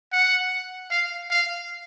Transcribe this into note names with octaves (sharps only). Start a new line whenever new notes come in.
F#5
F5
F5